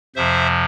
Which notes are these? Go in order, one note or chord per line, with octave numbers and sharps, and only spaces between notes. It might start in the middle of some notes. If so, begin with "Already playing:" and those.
F2 C3 F3 C5 E5